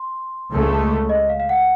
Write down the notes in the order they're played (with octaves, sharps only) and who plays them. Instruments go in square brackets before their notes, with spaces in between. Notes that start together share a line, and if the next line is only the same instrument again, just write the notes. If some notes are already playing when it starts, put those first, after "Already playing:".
Already playing: [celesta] C6
[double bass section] C#2 C#3 A3
[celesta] D#5
F5
F5
F#5